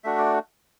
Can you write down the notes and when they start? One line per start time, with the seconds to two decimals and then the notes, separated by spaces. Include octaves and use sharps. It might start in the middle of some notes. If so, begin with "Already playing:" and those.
0.04 A3 D4 F#4 E5
0.18 D5